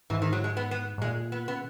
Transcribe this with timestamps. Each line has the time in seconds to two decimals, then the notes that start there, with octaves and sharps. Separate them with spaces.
0.10 G#2 E3
0.22 D#3
0.33 F#3
0.44 G#3
0.57 B3
0.71 B3
0.98 G#2
1.01 A#2 G#3
1.32 B3
1.48 C#3 B3